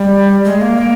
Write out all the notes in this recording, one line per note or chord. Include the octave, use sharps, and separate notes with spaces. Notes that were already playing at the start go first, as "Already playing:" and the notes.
Already playing: G3
G#3
A#3